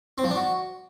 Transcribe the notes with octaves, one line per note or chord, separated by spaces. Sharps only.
C4
F3
D4
F#4